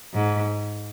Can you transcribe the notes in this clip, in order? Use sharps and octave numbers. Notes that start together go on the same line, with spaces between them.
G#2